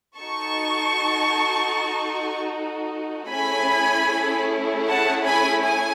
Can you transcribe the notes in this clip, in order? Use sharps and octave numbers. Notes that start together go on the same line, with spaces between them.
D#4 F#4 A4 A5 C#6
A3 C#4 E4 G#4 G#5 B5
F#5 A5
G#5 B5
G#5